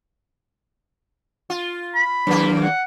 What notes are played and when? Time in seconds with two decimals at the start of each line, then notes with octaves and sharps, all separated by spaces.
1.50 F4
1.94 B5
2.27 D#2 F#3 A#3 D4
2.62 F#5